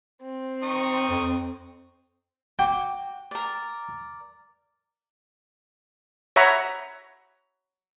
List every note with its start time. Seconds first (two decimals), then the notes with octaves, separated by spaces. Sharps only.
0.23 C4
0.63 D#4 C#6 D#6
1.10 F2
2.59 F#4 G5 D6
3.31 A#4 D5
6.36 C#5 E5 F#5 A#5 B5